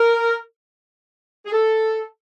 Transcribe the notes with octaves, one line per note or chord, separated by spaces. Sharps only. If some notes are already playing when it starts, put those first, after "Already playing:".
Already playing: A#4
G#4
A4